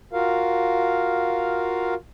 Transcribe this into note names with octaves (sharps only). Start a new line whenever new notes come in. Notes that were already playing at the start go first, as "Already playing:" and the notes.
F4 F#4 A#4 F5